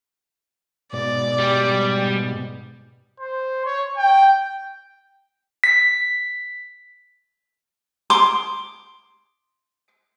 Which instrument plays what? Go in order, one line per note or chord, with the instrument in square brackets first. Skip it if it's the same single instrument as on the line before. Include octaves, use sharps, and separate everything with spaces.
[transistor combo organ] G#2 B2 [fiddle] D5
[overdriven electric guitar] G3
[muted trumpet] C5
C#5
G5
[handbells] B6
[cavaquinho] C6 D6 D#6